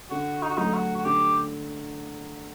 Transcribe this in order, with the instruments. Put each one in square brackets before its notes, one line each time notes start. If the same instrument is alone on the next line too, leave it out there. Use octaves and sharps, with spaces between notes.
[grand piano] D3 [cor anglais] F#4
[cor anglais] D#4
F#4
[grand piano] F#3 A3 [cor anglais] D#4
[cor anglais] F#4
F#4
[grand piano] D3 [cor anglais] G4